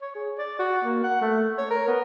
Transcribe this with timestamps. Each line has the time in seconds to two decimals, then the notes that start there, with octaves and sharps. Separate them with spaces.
0.01 C#5
0.15 G#4
0.38 D5
0.59 F#4
0.85 A#3
1.03 F#5
1.21 A3
1.58 C#5
1.71 A#4
1.88 B3